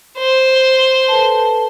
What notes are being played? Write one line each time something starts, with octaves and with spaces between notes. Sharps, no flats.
C5
A4 B4 A5